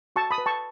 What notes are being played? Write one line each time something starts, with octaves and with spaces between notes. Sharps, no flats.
F#4 A5 C#6
B5 D#6
B4
A5 C#6